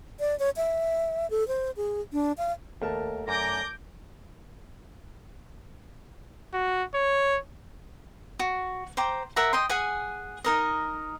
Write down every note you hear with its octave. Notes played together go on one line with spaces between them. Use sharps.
D5
C#5
E5
A4
C5
G#4
D4
F5
D#2 A3 A#4 A5
F#2 D5 G#5 A#5 D6 G6 A#6
F#4
C#5
F#4
C5 G5 A#5 D6
A#4 E5 F#5 A#5
D#5 G5 C6
G#4 F#5 G#5
D#4 A#4 D#5